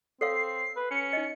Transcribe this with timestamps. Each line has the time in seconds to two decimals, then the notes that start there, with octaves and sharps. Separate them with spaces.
0.21 C4 A4 C#5 F5 C7
0.76 B4
0.91 C#4 C#7
1.13 D#4 D#5